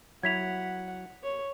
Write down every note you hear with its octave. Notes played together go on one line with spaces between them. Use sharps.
F#3 E4 F#4 F#5 G#6 B6 F7
C#5